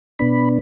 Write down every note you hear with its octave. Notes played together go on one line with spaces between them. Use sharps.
B2 B3 D4 B5